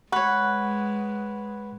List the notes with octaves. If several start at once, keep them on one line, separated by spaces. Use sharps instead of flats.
G#3 B4 C#5 F#5 C#6 F#6